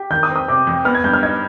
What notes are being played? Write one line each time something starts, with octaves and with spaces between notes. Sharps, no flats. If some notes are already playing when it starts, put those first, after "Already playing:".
Already playing: G4
D#3 G6
D#6
C4
D#6
C3 D6
F2
B3 F6
G#6
G2 G6
F6
D#4 G#6